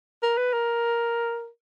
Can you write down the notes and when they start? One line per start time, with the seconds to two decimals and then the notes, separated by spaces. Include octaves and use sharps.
0.23 A#4
0.38 B4
0.53 A#4